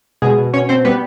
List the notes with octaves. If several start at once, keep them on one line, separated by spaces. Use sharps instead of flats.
B2 G#3 G#4
B2
B2 C#4 C#5
B2 C4 C5
G3 B3 B4